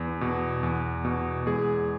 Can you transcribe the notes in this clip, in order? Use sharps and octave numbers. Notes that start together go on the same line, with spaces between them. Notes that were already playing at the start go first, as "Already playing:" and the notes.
Already playing: E2
B2
E2
B2
E2 G#3 G#4